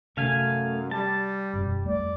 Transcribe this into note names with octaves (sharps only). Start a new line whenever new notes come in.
F#2 C3 D#3 A3 C#4 F5 G#5
G3 A5
E1 F#2 B2
F2 G3 A3 D5